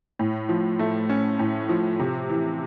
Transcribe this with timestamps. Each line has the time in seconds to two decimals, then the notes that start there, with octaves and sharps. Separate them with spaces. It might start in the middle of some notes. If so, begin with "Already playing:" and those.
0.19 A2
0.49 F3
0.79 A3
1.09 C#4
1.39 A2
1.69 F3
1.99 C3
2.30 E3